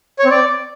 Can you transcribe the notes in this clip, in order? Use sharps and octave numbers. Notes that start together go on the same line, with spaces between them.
C#5
C4
D5